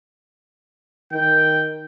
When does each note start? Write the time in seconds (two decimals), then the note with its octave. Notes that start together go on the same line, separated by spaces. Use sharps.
1.13 D#3 G5